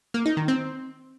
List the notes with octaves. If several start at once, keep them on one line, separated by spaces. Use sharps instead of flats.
A#3
D#4
D#3
C4